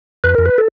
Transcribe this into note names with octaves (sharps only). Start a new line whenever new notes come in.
F2 B4
F2 A#4
B4
A4